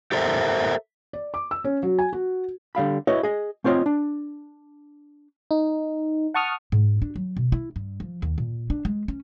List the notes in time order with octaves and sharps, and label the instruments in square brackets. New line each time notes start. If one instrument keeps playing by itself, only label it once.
[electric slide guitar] G4 A4 A#4 C5 E5
[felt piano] D5
D6
E6
C#4
F#3
G#5
F#4
[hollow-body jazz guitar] D3 G3 F5 B5
E4 F#4 B4 C#5 D#5
G#4 D#5
A3 C4 F4 C#5 D#5
D4
[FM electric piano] D#4
F#5 A5 C#6 D#6 F6
[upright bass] G#2
D4
F#3
B2
E4
G2
F3
D#2
A#2
D4
G#3
C#4